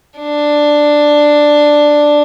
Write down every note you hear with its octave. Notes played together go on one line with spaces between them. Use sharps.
D4